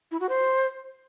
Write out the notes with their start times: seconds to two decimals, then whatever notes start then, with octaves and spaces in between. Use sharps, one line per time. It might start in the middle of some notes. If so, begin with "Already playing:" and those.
0.11 E4
0.20 F#4
0.29 C5